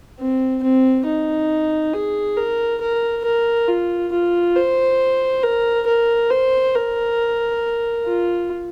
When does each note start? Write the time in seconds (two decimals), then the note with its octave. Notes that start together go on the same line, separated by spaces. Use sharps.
0.19 C4
0.63 C4
1.06 D#4
1.93 G#4
2.37 A#4
2.81 A#4
3.24 A#4
3.68 F4
4.12 F4
4.55 C5
5.43 A#4
5.86 A#4
6.30 C5
6.74 A#4
8.05 F4